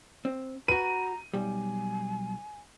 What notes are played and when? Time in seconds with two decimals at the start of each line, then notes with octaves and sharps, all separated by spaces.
0.25 C4
0.68 F#4 B4 A#5 D#7
1.34 B1 G3 G#5